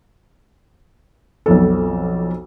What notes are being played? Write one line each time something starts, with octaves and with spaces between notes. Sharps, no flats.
B1 F2 A4